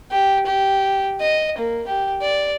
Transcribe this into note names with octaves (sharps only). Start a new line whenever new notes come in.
G4
G4
D#5
A#3
G4
D5